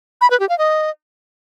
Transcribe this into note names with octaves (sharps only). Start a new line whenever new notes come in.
B5
B4
G4
F5
D#5